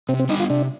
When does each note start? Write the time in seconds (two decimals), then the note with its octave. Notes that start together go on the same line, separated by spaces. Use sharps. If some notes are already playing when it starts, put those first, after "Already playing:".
0.09 C3 C4
0.19 C4
0.29 G3 B3 D4 D#4
0.40 F4
0.50 C3 D4